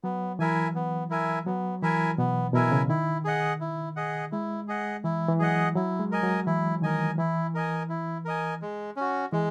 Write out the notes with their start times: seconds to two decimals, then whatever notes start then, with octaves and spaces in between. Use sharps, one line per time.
0.04 F#3 B3
0.39 E3 E4 A#4 E5 G#5
0.75 B3
1.10 E4 A#4 E5 G#5
1.46 F#3 B3
1.82 E3 E4 A#4 E5 G#5
2.18 B2 B3
2.54 B2 E4 A#4 E5 G#5
2.72 C#3
2.89 D#3 E4
3.25 G#4 D#5 F#5
3.60 E4
3.96 G#4 D#5 F#5
4.32 G#3 E4
4.68 G#4 D#5 F#5
5.04 E3 E4
5.29 E3
5.39 F#3 G#4 D#5 F#5
5.75 F#3 E4
5.99 G#3
6.11 A#4 D#5 G#5
6.23 F#3
6.46 E3 E4
6.82 D#3 A#4 D#5 G#5
7.18 E3 E4
7.55 A#4 D#5 G#5
7.89 E4
8.25 A#4 D#5 G#5
8.62 G#3
8.96 C#4 F#4
9.32 E3 G#3